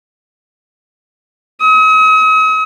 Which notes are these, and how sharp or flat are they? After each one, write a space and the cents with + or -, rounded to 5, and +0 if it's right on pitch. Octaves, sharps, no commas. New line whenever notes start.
D#6 +45